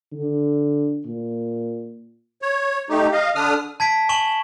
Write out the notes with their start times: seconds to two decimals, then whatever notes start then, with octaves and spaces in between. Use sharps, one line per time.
0.13 D3
1.05 A#2
2.42 C#5
2.90 A3 D#4 G4
3.12 D#5 F5
3.35 D3 D4 D#6 F6
3.80 A5 G#6 B6 D7
4.09 G#5 C#6 E7 F#7 G7